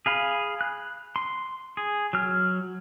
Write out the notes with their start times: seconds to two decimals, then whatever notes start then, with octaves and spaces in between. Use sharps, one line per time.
0.06 G#4 F5 B5
0.61 F#6
1.16 C6
1.77 G#4
2.13 F#3 F6